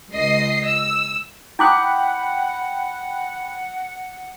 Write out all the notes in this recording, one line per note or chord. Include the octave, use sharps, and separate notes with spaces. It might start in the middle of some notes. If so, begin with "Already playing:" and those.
C#2 D#5 C7
E6
E4 F#5 G5 B5 D6 D#6 F#6